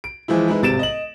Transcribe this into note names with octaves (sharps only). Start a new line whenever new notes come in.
D7
E3 F3 G#3 E4
G#3 D#4 E4 B4
D1 G#1 C3 A6 D7 E7
D#5 F#7